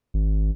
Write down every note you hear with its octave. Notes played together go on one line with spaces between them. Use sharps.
G#1